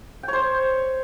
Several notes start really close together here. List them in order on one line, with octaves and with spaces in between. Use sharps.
G5 C#5 C5